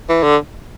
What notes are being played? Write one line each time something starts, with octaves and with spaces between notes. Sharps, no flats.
E3
D3